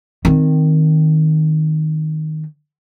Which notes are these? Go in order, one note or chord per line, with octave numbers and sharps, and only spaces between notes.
D#3 C4